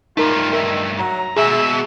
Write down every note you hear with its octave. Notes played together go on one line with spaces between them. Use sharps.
G2 A3 D#4 F4 A#4
D#3 A#4 E5
F#3 A#5
D#2 B2 G#3 G#4 E5